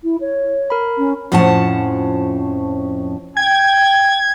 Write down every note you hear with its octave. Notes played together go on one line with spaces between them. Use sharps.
E4
C#5
A#4 B5
C#4
F2 A2 F3 C#4 F#5 A5
G5 G#6